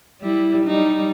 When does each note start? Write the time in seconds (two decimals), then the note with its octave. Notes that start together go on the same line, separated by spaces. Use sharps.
0.21 G3 E4
0.65 G3 D#4